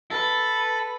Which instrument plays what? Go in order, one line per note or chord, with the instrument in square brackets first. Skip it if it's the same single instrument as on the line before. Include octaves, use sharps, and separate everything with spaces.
[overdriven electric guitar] A4 [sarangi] B4